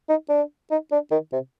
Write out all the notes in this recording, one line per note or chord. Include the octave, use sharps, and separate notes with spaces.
D#4
D4
D#4
D4
D#3
C3